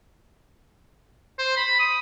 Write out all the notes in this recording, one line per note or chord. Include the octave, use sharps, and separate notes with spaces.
C5
B5
D#6